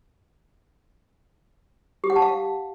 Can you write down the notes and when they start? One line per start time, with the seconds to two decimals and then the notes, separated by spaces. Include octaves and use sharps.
2.04 G4
2.10 F#5
2.16 A5
2.22 F5